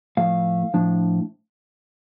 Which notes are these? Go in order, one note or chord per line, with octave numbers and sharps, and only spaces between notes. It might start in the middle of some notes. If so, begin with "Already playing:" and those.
A2 F3 A3 F5
A2 F3 D4